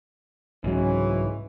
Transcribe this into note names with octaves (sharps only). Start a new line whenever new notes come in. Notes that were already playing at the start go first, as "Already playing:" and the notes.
C2 G#2 C#3 E3 F#3 C#4